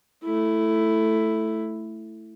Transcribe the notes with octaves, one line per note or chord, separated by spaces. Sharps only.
A3 E4